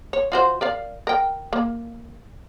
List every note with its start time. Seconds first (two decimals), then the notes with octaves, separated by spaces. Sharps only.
0.13 C#5
0.32 F4 F#4 C5
0.61 A#4 D5 F5
1.07 A#4 G5
1.53 A#3